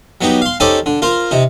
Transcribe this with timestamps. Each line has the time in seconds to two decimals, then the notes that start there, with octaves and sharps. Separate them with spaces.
0.21 F#3 B3 D#4 G4
0.42 F5 C6
0.60 C#4 D#4 G4 A4 C5 D5
0.86 D3
1.02 F4 A#4 C5
1.31 C3 D#4